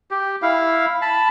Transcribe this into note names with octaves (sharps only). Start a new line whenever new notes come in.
G4
E4 F5
A5 B5